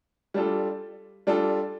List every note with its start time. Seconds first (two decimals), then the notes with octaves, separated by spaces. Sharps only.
0.34 G3 D4 F4 A4
1.27 G3 D4 F4 A4